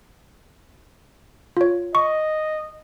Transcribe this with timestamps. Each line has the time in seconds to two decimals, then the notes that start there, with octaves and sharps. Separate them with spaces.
1.57 F4 C#5
1.95 D#5 C#6